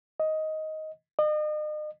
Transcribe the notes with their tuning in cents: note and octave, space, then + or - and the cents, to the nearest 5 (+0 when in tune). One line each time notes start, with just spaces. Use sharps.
D#5 +10
D#5 -40